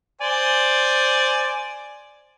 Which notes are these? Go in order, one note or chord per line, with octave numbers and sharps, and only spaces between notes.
C5 D5 G#5